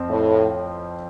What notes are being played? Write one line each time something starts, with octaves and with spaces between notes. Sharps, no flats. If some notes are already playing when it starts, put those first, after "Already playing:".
Already playing: F2 F3 C4
A2